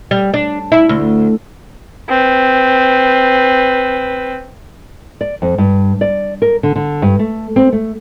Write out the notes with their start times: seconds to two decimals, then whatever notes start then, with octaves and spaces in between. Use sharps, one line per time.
0.11 G3
0.34 D4
0.72 E4
0.89 D2
2.08 C4 B4
5.21 D5
5.42 F2
5.58 G2
6.01 D5
6.42 A#4
6.63 D3
6.76 D3
7.02 G2
7.19 A3
7.56 C4
7.73 A3